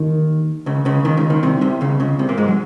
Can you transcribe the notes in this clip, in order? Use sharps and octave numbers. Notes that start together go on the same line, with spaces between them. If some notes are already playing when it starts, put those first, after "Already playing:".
Already playing: D#2 D#3
C#2 C#3
C#2 C#3
D#2 D#3
C#2 C#3
D#2 D#3
C2 C3
C2 C3
C#2 C#3
C#2 C#3
C2 C3
A#2 A#3
G#2 G#3
F#3